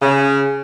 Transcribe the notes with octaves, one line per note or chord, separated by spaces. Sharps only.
C#3